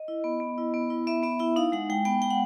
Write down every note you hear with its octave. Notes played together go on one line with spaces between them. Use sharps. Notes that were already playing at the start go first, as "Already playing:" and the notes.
Already playing: D#5
E4
B3
B3
E4
B3
E4
B3 E5
B3 E5
E4 E5
D#4 F5
G#3 F#5
G#3 G5
B3 G5
G#3 G5
F#5